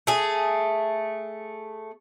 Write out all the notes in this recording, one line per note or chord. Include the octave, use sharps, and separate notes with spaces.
A3 G#4